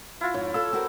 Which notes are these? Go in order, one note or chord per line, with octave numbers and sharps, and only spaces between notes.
E4 F4
F2 G#2 D#4 C#5
F4 A4 E6
C4 F#4 A#4